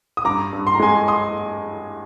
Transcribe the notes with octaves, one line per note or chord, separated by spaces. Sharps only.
D#6
G2 A#5 D6
G2
C6
A#5
G#3 G#5 C6
C6 D#6